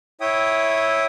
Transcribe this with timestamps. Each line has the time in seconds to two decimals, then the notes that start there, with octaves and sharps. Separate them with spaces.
0.21 E4 C#5 E5 G5 D#6